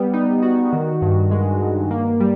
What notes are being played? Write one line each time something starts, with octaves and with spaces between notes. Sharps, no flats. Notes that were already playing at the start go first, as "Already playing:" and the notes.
Already playing: G3 B3
D#4
F#4
D#3
G2
G#3
G2
A#3
G3